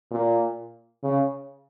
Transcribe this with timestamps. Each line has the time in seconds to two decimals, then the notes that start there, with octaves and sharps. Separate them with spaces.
0.11 A#2
1.04 C#3